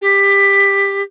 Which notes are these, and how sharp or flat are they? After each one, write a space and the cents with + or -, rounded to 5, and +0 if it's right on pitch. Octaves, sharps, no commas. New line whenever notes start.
G4 +20